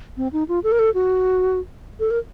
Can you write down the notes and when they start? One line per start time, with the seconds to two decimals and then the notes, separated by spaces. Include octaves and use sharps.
0.17 C4
0.33 D#4
0.49 F4
0.64 A4
0.72 A#4
0.79 A4
0.94 F#4
2.00 A4
2.10 A#4